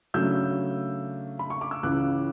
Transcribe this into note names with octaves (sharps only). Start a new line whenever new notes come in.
C#3 F#3 A3 D4 E6 G6
B5
C#6
D6
E6
C#2 C#3 E3 D6 F#6